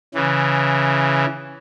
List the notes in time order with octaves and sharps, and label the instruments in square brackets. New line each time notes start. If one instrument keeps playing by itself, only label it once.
[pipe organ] C#3 E3